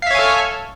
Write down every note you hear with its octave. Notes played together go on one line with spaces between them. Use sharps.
A4 C#5 E5 F5 G#5